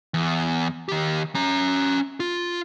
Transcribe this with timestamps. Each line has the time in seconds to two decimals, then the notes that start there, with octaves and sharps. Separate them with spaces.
0.14 E2
0.89 D#3 G4
1.35 C#4 A#5
2.20 F4